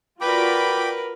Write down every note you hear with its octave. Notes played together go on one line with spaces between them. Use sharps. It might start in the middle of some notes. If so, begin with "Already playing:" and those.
F4 F#4 A#4 B4 D5 G5 B5 D6